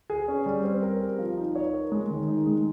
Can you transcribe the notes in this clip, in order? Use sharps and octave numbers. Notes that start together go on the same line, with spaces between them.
G#4
C#4
G3
C4
A#4
G4
F3
D#4
C#5
A#4
G#3
D#3
D#4
G#3